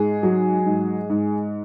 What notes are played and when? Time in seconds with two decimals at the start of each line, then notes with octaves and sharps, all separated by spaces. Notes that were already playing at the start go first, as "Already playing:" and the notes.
Already playing: G#2 G#4
0.23 F#3
0.66 G#2
1.10 G#2